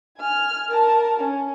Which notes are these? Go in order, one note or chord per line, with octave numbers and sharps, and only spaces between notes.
G#5 F6
A#4 A5
C#4